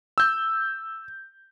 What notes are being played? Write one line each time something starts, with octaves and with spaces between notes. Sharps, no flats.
E6 G6